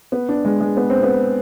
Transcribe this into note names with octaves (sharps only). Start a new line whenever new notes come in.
B3
D4
G#3
G#3
B3
C4
B3